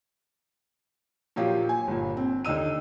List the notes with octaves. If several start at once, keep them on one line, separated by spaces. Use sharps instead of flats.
A#2 F3 F#3 F4 G4
G#5
G1 A#2
C4
D#2 D3 D#4 E6 D#7